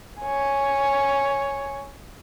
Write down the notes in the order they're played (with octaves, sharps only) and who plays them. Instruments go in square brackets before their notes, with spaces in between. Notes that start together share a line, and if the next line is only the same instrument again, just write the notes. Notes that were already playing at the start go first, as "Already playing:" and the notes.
[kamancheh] C#5 G#5